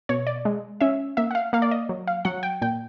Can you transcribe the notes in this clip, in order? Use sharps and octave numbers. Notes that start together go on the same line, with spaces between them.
B2 C#5
D5
G#3
C#4 E5
A#3 E5
F#5
F5
A#3 F5
D5
D#5
F#3
F5
F#3 F#5
G5
A#2 G5